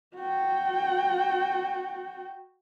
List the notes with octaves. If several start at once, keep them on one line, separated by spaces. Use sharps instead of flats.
F#4 G5